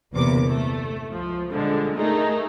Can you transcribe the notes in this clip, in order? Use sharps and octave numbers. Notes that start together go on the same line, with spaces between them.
G1 E2 C3 A#3 D6
A3
C#2 F3
A#2 D3 F3 G3 G#3
A3 D#4 G#4 A#4